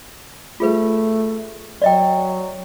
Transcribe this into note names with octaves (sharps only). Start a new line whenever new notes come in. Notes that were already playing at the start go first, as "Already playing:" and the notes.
A3 F4 G#4 B4
F#3 D5 D#5 G5